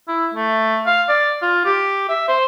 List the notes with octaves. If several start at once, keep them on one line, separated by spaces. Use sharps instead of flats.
E4
A3
F5
D5
F4
G4
E5
C5